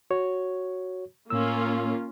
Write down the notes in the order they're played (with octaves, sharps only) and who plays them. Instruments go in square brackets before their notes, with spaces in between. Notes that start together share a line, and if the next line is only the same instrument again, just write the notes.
[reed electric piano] F#4 C#5
[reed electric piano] A2 E6 [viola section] A#3 C#4 F4